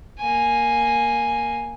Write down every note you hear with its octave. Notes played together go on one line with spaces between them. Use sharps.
A#3 G#5